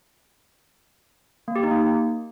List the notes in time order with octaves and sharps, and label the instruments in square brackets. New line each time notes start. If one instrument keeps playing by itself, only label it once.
[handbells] A#3
G4
D#4
A#3